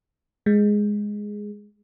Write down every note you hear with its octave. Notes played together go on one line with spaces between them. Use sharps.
G#3